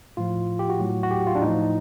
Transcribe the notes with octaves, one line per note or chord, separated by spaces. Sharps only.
A2 F3 F4
G4
F#4
A2 F#3
F#4
G4
F4
D4
A2 F3 D#4